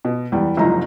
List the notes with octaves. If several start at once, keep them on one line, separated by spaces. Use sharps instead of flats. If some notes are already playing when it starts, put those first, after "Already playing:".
B2
E2 G3
F#1 C2 F3 D#4 A#5